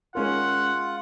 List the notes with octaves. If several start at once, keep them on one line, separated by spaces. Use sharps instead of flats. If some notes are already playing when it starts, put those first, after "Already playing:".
G#3 C#4 F4 A#4 F#5